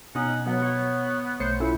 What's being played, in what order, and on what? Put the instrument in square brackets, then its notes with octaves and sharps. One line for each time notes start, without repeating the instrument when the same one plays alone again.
[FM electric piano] B2 [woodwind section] C#4 F#5 [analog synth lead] D#4
[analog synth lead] F#3 [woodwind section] B3
[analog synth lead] C#5
[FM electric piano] B1 C#7 [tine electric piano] A3 C#5 [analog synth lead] C5
[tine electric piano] C#4 F4 A4 [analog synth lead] E4